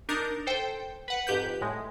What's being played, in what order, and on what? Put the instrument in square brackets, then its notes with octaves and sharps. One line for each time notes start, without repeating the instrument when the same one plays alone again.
[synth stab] D4 D#4 A#4 G6 A6
A4 C5 G5
B4 F#5
F2 G#2 G4 B4 G6
A2 G#3